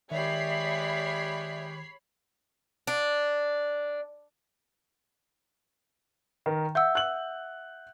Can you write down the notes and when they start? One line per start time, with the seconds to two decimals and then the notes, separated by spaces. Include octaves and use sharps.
0.11 D#3 G#3 G4 C#5 D5 E5 B5 C7
2.87 D4
6.46 D#3 A#4
6.75 E5 F#5 E6 G6
6.95 F#6 F#7